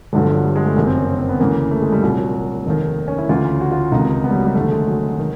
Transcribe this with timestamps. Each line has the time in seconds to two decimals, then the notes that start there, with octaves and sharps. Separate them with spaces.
0.13 G1 G2 D3 F#3
0.24 F3
0.34 F#3
0.45 G3
0.56 G#3
0.66 A3
0.77 F#1 F#2 D#3 B3
0.87 C4
0.97 C#4
1.08 C#4
1.19 C4
1.29 B3
1.39 D2 C#3 E3 A#3
1.71 A3
1.82 G#3
1.92 G3
2.03 C2 A#2 F#3
2.18 F#3
2.66 F1 D#2 D#3
3.08 C#4
3.18 E4
3.29 D2 C#3 E3 F4
3.61 F#4
3.72 F4
3.92 C#2 C3 D#3 D#4
4.24 B3
4.30 G3
4.34 F#3
4.45 G3
4.55 F1 D#2 D3 A3
4.71 G#3
4.87 F#3
5.19 D#3